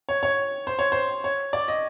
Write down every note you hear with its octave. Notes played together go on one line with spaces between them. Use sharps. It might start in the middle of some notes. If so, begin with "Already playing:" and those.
C#5
C#5
C5
C#5
C5
C#5
D5
D#5